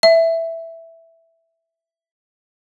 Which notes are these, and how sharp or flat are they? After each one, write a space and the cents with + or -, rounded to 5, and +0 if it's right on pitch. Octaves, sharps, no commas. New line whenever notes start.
E5 +0